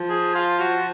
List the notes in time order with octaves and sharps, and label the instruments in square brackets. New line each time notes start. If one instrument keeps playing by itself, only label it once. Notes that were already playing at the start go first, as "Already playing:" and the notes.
Already playing: [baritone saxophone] F3
[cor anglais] G#4
F4
F#4